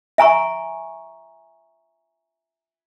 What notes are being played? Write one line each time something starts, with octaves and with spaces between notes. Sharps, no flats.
E5 G#5 A#5 C#6